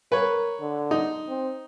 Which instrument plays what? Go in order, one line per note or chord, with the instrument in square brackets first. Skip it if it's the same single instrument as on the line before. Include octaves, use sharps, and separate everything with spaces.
[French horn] A#4 [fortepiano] B4 C#5
[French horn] D3
[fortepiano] D#4
[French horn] C4